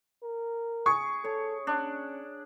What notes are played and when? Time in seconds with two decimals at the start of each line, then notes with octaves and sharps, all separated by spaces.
0.23 A#4
0.86 G#4 C#6
1.24 A4 C#5
1.67 C#4 D4